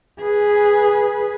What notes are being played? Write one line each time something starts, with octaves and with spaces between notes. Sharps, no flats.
G#4 B4